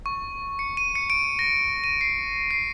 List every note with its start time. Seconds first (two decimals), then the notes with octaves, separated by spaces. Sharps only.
0.06 C#6
0.59 C#7
0.77 D#7
0.95 C#7
1.10 D7
1.39 A#6
1.84 D#7
2.01 C7
2.51 C7